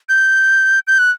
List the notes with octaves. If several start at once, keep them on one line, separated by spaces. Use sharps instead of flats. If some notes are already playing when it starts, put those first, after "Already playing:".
G6
G6
F#6